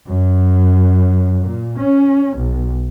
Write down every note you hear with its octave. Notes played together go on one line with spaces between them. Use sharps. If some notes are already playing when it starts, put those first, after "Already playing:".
F#2
A#2
C#4
B1